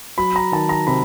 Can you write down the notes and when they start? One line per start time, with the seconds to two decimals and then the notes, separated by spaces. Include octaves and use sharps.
0.18 F#3 B5
0.36 A#5
0.52 D#3 A5
0.69 A#5
0.87 C3 B5